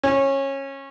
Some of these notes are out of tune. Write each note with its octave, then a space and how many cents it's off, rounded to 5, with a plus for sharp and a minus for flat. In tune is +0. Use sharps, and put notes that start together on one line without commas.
C#4 -20